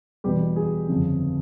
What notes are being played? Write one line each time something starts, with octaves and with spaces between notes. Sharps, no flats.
E2 B2 G3 G4
G#4
G1 F2 C#3